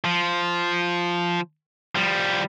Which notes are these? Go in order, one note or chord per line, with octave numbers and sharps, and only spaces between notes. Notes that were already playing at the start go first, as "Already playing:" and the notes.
F3
F3 G3